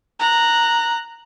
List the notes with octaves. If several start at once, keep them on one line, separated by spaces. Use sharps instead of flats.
A#5 F#6